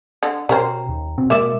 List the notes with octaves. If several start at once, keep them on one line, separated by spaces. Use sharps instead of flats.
D3
B2 C#4 A#4 C5 G5 A#5
D#2
E2 B2 C4
B2 G#3 A#3 A#4 D5 E5 D6 E7